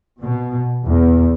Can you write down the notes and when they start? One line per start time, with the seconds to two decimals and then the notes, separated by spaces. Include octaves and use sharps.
0.21 B2
0.87 E2